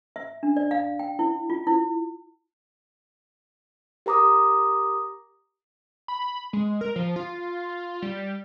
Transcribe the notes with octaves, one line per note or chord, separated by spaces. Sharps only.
E5
D4
D5
F5
G5
E4
F4
E4
G4 A#4 A#5 D6 D#6
B5
G#3
A#4
F3
F4
G3